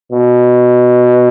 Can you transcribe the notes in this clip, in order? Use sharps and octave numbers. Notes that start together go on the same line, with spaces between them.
B2